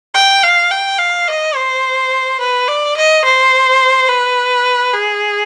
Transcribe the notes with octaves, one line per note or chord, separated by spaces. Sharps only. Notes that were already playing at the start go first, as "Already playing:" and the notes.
G5
F5
G5
F5
D#5
C5
B4
D5
D#5
C5
B4
G#4